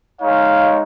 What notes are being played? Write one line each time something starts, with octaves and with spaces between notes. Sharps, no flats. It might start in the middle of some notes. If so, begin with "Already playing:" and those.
G#3 D#4 C#5 F5